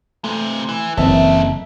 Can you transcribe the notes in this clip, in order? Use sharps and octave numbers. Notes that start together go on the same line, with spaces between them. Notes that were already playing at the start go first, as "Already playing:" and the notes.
C3 E3 A3
E3
F#1 E3 C4 D#4 A4 E5